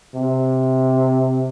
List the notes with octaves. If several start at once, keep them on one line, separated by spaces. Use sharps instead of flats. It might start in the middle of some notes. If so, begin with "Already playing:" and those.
C3